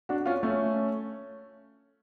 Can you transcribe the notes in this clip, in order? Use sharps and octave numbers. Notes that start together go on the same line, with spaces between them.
D4 F#4
C#4 F4
A3 C#4